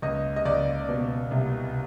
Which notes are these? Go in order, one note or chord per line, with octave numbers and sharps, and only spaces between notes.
C#2 D#5
D#5
C#2 D5
B2
C2